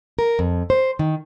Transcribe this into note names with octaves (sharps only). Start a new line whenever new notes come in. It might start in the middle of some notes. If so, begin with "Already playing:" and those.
A#4
F2
C5
D#3